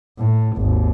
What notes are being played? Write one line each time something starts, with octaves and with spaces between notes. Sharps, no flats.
A2
G#1 D#2